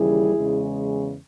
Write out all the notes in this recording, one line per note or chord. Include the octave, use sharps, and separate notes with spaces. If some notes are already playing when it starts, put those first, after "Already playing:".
Already playing: D#2 C#3 E3 G3 E4 G#4
E2 C#3 G#3